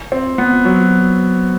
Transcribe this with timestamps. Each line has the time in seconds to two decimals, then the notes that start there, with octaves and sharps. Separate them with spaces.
0.12 C4
0.38 B3
0.65 F#3